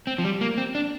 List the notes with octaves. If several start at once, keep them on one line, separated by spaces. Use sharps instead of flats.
C4
F3
G3
A#3
C4
D4